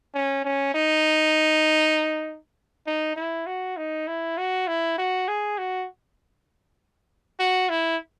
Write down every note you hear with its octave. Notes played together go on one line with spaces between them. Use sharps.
C#4
C#4
D#4
D#4
E4
F#4
D#4
E4
F#4
E4
F#4
G#4
F#4
F#4
E4